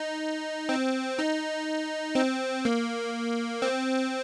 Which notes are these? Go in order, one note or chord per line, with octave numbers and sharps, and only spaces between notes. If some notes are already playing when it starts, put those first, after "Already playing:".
Already playing: D#4
C4
D#4
C4
A#3
C4